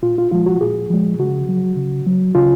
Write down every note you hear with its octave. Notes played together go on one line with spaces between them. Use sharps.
A#2 F4
F4
F3 G#3 F4
F#4
A#2 G#4
F3 G#3
C#3 F#4
F#3
C#3
F#3
C#3 F4